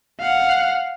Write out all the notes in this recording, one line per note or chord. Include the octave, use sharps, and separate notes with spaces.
F5 F#5